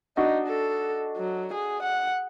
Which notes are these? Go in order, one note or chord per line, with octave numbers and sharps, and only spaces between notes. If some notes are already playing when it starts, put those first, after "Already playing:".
D4 D#4 F#4 D#5
A4
F#3
G#4
F#5